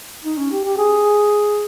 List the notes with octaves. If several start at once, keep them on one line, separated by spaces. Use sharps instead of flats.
D#4
C#4
G4
G4
G#4